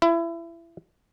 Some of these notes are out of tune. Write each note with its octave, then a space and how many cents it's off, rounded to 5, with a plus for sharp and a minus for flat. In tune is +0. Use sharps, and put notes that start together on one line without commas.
E4 +25